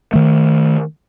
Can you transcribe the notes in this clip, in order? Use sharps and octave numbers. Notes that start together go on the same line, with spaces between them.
D#3 A3